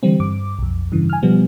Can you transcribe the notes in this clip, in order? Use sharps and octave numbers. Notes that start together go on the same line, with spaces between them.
D3 E3 G3 C4
G2 D6
B1 F2
G2 C#3 E3
G#5 F6
B2 F3 G3 B3